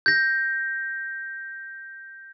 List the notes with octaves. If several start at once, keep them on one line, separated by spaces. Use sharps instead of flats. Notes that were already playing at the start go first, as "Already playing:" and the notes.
G6 A#6